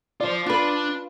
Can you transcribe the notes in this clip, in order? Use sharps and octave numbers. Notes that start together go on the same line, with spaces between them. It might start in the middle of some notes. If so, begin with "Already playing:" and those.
F4 C5 D5
D4 F4 B4